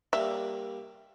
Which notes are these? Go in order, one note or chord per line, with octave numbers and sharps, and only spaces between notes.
G3 A#3 D4 E5